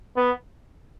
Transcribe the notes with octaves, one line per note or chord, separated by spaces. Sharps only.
B3